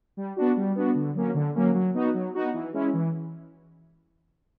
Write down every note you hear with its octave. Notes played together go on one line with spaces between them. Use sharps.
G3
B3 D4 F#4
G3
B3 D4 F#4
D3
F#3 A#3 C#4
D3
F#3 A#3 C#4
F#3
B3 D#4 F#4
F#3
B3 D#4 F#4
E3
G#3 C#4 E4
E3